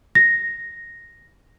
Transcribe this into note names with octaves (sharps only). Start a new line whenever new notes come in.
A#6